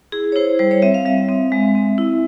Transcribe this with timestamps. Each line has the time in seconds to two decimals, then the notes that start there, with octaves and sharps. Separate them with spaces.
0.12 E4 G#4
0.32 C#5
0.36 E4 C5
0.59 G3 C5
0.71 C#5
0.82 C4 E5
0.94 F5
1.05 G3 E5
1.29 C4
1.52 G#3
1.75 C4
1.98 E4